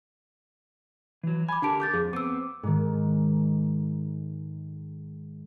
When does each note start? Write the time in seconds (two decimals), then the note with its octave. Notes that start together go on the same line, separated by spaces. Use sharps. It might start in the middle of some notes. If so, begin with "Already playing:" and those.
1.23 E3 F#3
1.49 G#5 B5 D6
1.62 D3 D4 G4 A#4 A5 D7
1.80 D6 G6 A6
1.93 F2 G#4
2.13 B3 C4 D6 E6
2.63 G#2 D#3